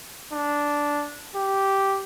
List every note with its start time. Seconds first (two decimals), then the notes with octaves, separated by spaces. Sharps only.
0.33 D4
1.36 G4